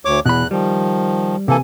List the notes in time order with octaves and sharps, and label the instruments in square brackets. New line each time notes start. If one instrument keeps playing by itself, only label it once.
[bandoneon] D2 C#5 D6
[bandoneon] E2 F#6 [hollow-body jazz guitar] B2 E3 B5
[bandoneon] D#3 F3 [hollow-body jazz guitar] G3
[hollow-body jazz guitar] C3 G#5 [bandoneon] E3 A#3 A4